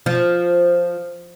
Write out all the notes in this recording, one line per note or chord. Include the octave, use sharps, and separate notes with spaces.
F3